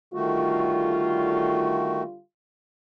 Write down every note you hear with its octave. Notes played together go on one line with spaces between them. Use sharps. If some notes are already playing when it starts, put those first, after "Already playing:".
D3 D#3 G3 A3 F4 F#4